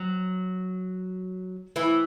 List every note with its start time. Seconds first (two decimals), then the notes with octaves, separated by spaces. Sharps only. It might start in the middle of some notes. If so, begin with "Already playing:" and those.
Already playing: F#3
1.76 E3 E4